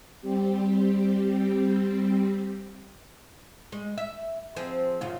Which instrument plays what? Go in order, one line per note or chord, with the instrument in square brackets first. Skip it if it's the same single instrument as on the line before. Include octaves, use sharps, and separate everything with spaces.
[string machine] G3 C4 G4
[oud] G#3
E5
F3 C4 G#4
F#2 C#3 F4